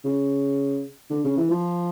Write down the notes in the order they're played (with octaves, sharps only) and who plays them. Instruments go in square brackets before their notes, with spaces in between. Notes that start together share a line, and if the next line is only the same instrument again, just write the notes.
[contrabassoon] C#3
D3
C#3
E3
F3